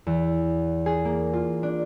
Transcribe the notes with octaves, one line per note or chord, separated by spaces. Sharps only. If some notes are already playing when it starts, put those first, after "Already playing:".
E2
G#4
A#3
F4
D4